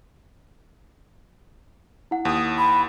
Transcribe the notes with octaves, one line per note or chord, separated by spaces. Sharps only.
E4 F#5
D#2 D#6
B5